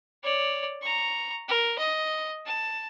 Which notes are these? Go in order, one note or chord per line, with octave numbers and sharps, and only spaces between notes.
C#5 D5
A#5 C#6
A#4
D#5
A5